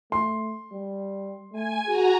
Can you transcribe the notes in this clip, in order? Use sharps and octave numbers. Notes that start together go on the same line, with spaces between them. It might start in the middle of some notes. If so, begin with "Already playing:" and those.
A3 C6
G3
A3 G#5
F#4 G#4 A#5